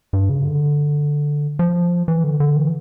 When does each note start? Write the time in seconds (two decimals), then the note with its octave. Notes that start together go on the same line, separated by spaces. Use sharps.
0.13 G2
0.29 C#3
0.45 D3
1.59 F3
2.08 E3
2.24 D3
2.40 D3
2.56 E3